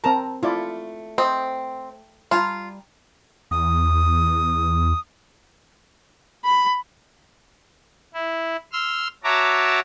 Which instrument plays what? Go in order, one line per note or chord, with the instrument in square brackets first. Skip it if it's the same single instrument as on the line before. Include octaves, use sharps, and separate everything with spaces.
[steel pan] C4 A#4 A#5 [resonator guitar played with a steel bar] A5
[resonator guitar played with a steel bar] A3 [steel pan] E4 F4 D5
[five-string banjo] C4 [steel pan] C5 D#5
[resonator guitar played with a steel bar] G3 G#5 A#5 [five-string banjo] F4
[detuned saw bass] E2 [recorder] D#6
[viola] B5
[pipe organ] E4
C6 E6 F6
F#4 C#5 E5 A5 A#5 D6